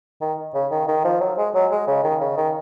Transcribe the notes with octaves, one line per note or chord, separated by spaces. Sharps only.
D#3
C#3
D#3
D#3
F3
F#3
G#3
F#3
G#3
C#3
D#3
C#3
D#3